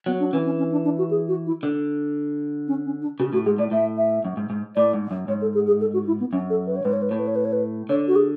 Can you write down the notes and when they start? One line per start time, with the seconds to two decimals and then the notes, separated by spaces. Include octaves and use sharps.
0.06 F#3 B3
0.20 D4
0.33 E3 C#4
0.46 C#4
0.58 C#4
0.72 D4
0.84 D4
0.98 F#4
1.11 G#4
1.28 F#4
1.46 E4
1.63 D3
2.68 C#4
2.85 C#4
3.02 D4
3.20 C#3 F#4
3.33 A2 F#4
3.45 G#2 G#4
3.58 A2 D5
3.71 A2 E5
3.97 E5
4.25 F#2
4.37 G#2
4.50 G#2
4.76 A2 D5
4.93 G#2
5.11 F#2
5.28 G#2 C#5
5.42 A4
5.54 G#4
5.67 G#4
5.81 A4
5.93 F#4
6.07 E4
6.20 B3
6.33 F#2 C#4
6.50 A4
6.67 B4
6.76 C#5
6.85 G#2 B4
6.93 C#5
7.02 B4
7.10 A2 C#5
7.19 B4
7.27 C#5
7.36 B4
7.45 C#5
7.53 B4
7.89 D3 C#5
8.08 F#4
8.16 G#4